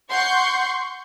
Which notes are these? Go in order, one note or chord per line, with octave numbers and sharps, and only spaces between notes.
F#5 C6 C#6 G6